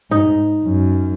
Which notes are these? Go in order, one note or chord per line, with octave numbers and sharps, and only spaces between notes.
G#2 D#4
F#2